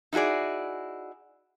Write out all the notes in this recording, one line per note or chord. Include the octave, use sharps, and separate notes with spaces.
D#4 E4 F#4 G#4 D5